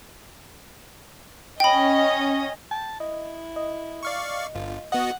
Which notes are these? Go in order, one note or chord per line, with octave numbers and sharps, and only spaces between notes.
C#4 D#5 G5 B5
G5 A5
E4 D#5
D#5
D5 F5 C#6
G1 F4
B3 F#4 D#5 F#5